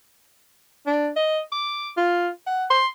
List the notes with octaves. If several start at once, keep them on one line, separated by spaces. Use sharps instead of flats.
D4
D#5
D6
F4
F#5
C6